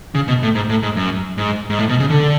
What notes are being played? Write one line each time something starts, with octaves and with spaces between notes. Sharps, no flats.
C#3
B2
A2
G#2
A2
G#2
F#2
G#2
G#2
A2
B2
C#3
D3